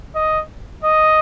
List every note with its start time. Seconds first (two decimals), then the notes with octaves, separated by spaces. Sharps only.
0.15 D#5
0.84 D#5